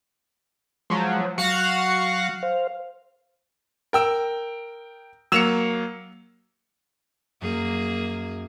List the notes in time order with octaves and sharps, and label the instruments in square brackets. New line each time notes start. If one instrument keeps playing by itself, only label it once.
[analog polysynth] F3 F#3 [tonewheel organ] G#3
[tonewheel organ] F#3 [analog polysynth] F#4 F5 F#5
[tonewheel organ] C5 F5
[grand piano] A#4 G5 E6
[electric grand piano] F#3 A#3 C#7 [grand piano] E6 E7 F7
[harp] F#2 [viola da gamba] A#3 G#4